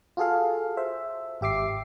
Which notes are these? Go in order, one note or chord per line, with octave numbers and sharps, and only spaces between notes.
F4 F#4 G#4 A4 F5
C5 E5
G#1 G4 E5 D6 C7